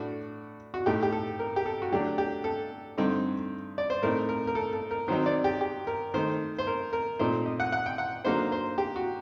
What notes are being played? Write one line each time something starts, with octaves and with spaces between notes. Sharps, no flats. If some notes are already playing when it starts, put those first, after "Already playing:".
Already playing: A2 A3 D4 F#4
F#4
A2 A3 D#4 G4
G4
A4
A#4
G4
A4
F#4
D3 F#3 A3 D4 G4
G4
A4
G2 D3 A3 C4 D#4
D5
C5
A2 A3 C4 D#4 A#4
A#4
A#4
A4
A4
A#4
D#3 F#3 C4 D#4 C5
D5
G4
G4
A#4
D#3 A3 D#4 C5
C5
A#4
A#4
A#2 A3 C4 D#4 C5
D#5
F#5
F#5
G5
F#5
D3 F#3 A#3 D#4 C5
C5
G4
F#4